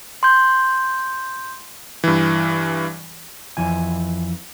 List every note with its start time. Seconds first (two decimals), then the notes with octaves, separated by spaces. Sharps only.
0.23 C6 G6
2.04 G2 E3
3.57 F2 E3 G#5